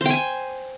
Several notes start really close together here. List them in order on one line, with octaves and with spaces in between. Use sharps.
C5 G5 G#5